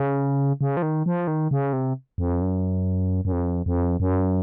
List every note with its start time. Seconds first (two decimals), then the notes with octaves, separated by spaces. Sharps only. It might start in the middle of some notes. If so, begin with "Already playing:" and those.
Already playing: C#3
0.61 C#3
0.77 F3
0.82 D#3
1.06 F3
1.27 D#3
1.51 C#3
1.73 C3
2.18 F2
2.41 F#2
3.25 F#2
3.32 F2
3.66 F2
4.00 F#2